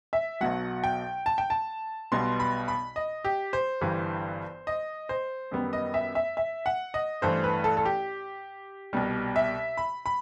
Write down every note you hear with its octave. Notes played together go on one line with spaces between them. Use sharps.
E5
B1 B2 F#3 F#5
G5
A5
G5
A5
B1 B2 G3 B3 C6
B5
B5
D#5
G4
C5
G1 G2 E3 G3
D#5
C5
F#2 D#3 G3 B3
D#5
E5
E5
E5
F#5
D#5
A1 G2 E3 A3 C5
B4
A4
A4
G4
C2 B2 G3
E5
B5
B5